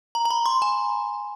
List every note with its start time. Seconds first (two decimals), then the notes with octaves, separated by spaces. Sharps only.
0.15 A#5
0.25 A#5
0.30 B5
0.46 C6
0.62 G#5